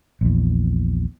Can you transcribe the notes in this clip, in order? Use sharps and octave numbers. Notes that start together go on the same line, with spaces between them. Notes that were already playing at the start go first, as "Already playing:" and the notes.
A#1 E2